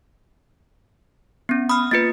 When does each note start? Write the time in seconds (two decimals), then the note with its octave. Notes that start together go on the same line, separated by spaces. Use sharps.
1.49 B3 C#4
1.69 B5 D#6 F6
1.91 A#3 F4 B4 A6 C#7